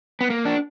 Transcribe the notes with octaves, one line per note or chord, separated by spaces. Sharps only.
B3
A#3
D4